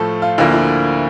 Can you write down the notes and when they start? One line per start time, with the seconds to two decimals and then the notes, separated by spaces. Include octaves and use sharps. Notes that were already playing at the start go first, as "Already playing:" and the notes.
Already playing: A2 F3 A3 A4
0.22 F4
0.38 D2 D3 F3 A#3 E4
0.53 E4